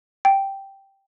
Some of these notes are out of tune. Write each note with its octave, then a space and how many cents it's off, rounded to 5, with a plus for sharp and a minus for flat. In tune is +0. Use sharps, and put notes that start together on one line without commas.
G5 -5